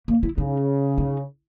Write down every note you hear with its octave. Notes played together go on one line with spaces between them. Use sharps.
A#3
E4
C#3 D#4
D#4